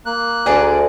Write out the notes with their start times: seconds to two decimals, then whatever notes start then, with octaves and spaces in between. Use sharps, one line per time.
0.06 A#3 F#6
0.46 D2 G#4 D5